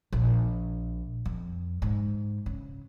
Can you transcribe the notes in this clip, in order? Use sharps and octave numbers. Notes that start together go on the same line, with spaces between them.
A#1
F2
G#2
C#3